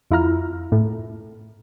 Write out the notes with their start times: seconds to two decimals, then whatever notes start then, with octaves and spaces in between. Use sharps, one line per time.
0.11 F2 E4 F4 A#5 F6
0.72 A2